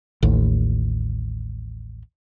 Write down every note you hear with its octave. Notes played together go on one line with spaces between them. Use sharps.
A1 D#2